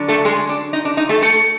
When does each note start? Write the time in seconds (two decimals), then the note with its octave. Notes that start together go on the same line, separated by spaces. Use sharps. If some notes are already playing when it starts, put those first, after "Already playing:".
Already playing: D3 F#3 D4
0.08 A3 A4
0.25 G#3 G#4
0.49 D4
0.73 D#4
0.85 D4
0.97 D#4
1.09 A3 A4
1.22 A3 A4